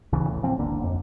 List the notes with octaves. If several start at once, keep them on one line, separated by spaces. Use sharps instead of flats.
A1 D2 C#3 E3
A2
F3 C4
D1 G#1 D3 A#3
F2